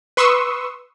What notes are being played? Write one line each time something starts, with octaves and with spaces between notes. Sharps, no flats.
B4 C6 C#6 D#6 E6